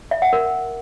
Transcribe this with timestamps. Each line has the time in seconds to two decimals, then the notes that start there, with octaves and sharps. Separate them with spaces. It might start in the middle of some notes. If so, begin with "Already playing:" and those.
0.11 E5
0.22 F#5
0.33 A#4